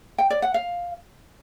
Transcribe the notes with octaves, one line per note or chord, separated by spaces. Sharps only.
G5
D5
F#5
F5